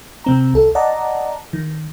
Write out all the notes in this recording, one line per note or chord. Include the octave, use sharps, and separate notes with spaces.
C3 C4 A#5
C2 A4
D5 D#5 F#5 A5 A#5
D#3